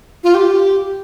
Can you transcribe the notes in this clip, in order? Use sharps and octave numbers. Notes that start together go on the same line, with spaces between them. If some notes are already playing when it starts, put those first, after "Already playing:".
F4
G4